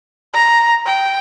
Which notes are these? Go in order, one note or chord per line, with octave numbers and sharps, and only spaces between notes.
A#5
G5